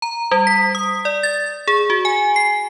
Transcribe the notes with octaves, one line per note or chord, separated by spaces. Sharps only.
A#5
G3
B6
D#6
D5
A6
G#4
F#4
G#5
C7